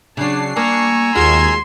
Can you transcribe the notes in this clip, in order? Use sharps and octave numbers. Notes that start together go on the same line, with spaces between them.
C#3 F#3 D4 A5 C7
G3 A#3 G#5 A#5 C#6 E6
D#2 G#3 F4 F#4 C6 G#6 E7